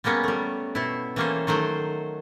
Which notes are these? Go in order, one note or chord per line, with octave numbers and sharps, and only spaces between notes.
G3 G#3 A#3 B3 C#4
G3 A3
B2 E4
E3 G3 A#3 C#4 A4 C5
D#3 F#3 A3 C5